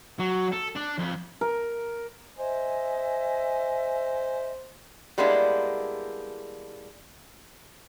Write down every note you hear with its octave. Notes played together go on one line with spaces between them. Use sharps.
F#3
A4
D4
F2
A#4
C5 D#5 E5 G#5
G3 G#3 A#3 B3 D4 E4